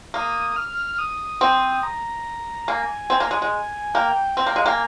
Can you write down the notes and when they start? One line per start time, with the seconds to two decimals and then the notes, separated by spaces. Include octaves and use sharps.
0.14 A#3 D#6
0.56 F6
0.72 F6
0.93 F6
0.98 D#6
1.41 C4
1.83 A#5
2.68 A#3 G#5
3.10 C4
3.20 A#3
3.31 G#3
3.42 G#3
3.94 A#3 G5
4.37 C4
4.47 A#3
4.56 G#3 F5
4.65 A#3 G5
4.71 G#5